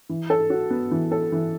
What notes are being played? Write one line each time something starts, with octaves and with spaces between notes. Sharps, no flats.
E3
A4
F#4
B3
E3
A4
E3